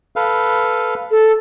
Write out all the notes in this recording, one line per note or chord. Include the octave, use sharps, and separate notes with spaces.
A4 B4 F5
A4